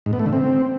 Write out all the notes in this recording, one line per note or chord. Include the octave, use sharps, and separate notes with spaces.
G#2
B3
A3
D3
C4